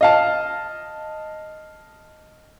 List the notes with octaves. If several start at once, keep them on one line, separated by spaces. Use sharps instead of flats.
D#5 F5 A5